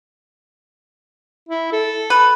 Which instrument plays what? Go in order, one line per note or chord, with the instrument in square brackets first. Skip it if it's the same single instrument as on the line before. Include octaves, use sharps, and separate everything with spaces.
[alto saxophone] E4
A4
[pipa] B4